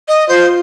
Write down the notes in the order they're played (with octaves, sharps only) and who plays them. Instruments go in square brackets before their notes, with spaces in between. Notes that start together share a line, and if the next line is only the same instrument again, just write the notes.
[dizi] D#5
[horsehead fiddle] F4 [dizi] C5